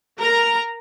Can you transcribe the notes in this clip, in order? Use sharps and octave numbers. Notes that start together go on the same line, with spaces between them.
A#4 A#5